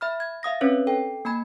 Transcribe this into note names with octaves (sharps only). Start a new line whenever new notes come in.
E5 B5 F6
G#6
E5 F5 D#6 A#6
C4 C#4 B4 C#5
A4 G5
A#3 G#5 B5 G#6